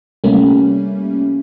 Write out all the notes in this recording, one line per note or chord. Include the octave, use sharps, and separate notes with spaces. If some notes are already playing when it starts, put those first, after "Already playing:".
C3 G3 A3 A#3 C#4